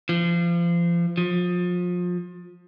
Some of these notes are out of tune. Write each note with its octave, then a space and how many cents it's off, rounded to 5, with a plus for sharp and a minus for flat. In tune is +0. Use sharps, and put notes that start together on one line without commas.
F3 -30
F3 +30